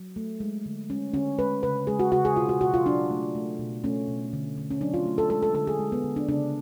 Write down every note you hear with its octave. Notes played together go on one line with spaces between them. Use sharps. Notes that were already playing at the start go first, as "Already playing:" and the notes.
Already playing: F#3
A3
G#3
D3
G#3 C#4
D3 C#4
G#3 B4
C#3 B4
G#3 G#4
F#4
C#3 F#4
G#4
B2 F4
F#4
B2 F#4
F4
F#3 D4
A3
A3
B2
A3 C#4
B2
D3
D3
C#4
F#3 D4
F4
A3
A4
G#3 A4
A4
D3 A4
G#4
G#3
B3
D3
D4
C#3 D4